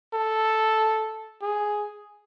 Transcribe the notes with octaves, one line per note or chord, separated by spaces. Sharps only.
A4
G#4